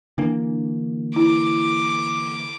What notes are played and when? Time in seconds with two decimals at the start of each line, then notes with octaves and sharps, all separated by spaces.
0.18 D3 E3 A#3 D4
1.16 E4 D6